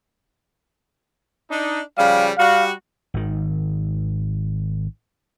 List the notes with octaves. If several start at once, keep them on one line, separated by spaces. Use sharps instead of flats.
D4 D#4
C#3 F3 G3 F5
G3 F#4 F5
G#1 D#3